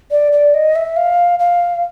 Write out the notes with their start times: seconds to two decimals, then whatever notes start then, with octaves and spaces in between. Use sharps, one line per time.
0.11 D5
0.32 D5
0.54 D#5
0.76 E5
0.97 F5
1.39 F5